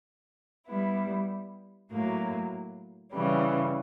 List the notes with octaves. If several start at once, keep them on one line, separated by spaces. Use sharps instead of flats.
G3 B3 E4
A2 F#3 A#3
C#3 E3 G3